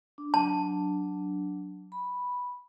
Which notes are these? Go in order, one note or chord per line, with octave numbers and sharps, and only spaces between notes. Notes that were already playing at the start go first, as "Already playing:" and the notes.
D4
F#3 D4 A5
B5